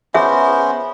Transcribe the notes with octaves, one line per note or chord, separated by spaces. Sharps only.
B3 C#4 G#4 C5 E5